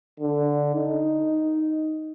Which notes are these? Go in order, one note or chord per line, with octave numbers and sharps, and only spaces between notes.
D3
D#4